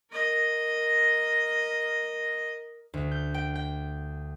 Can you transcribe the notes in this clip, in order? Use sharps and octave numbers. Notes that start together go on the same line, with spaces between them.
A#4 D#5
D2
G6
G5
G5